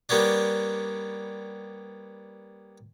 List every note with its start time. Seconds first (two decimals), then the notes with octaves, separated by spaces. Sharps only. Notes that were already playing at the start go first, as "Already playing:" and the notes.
0.09 G3 A#3 B3 C#4 D4